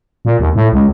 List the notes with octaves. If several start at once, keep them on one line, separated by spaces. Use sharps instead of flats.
A#2
D#2
A2
C#2